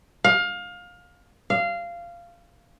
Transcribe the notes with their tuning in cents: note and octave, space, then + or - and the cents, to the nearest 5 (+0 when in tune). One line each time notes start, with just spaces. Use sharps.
F5 +25
F5 -15